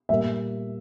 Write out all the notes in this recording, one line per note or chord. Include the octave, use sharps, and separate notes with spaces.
A#2 G3 A#3 E5